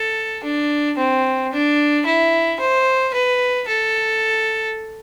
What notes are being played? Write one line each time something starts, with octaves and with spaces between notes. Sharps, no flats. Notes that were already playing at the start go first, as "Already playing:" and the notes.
Already playing: A4
D4
C4
D4
E4
C5
B4
A4